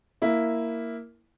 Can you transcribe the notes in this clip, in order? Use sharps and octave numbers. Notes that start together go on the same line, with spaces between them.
A#3 E4